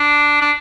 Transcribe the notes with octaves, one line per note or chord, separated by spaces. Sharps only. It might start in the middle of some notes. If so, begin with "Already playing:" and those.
Already playing: D4
D4